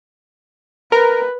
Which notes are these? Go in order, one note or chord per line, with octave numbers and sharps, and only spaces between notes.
A#4 B4